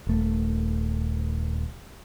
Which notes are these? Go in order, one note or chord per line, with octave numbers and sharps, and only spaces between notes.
D#1 A3